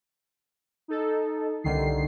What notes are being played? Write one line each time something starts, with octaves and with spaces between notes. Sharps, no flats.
D#4 A4
C2 D3 D#3 C7